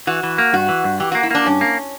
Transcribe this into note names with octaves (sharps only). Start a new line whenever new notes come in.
E3 F#4
E3
A#3
G2 F#4
E3
G2
E3 G4
A#3 F#4
E4
A#3 D4
G2 C#4
A#3